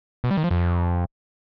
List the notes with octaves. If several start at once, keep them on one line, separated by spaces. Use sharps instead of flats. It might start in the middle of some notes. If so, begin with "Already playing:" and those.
B2
G3
D#3
F3
F2